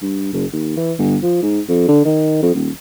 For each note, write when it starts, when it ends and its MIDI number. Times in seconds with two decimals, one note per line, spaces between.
0.02 0.32 43
0.33 0.45 30
0.53 0.74 39
0.77 0.93 52
0.98 1.17 31
1.22 1.41 53
1.42 1.60 44
1.69 1.85 41
1.88 2.02 50
2.05 2.38 51
2.42 2.52 41
2.54 2.69 27